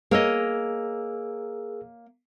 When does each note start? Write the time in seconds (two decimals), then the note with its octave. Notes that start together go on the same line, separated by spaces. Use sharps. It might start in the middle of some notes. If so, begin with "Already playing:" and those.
0.11 A#3 G#4 A#4 C#5 D#5 E6